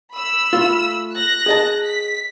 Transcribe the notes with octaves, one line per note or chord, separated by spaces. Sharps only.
B5 E6
A3 F4
F#6 A#6
G#4 D#5 A5
B6